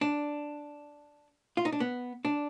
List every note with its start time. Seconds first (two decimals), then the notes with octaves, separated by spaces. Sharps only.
0.01 D4
1.57 F4
1.65 D#4
1.72 D4
1.80 B3
2.25 D4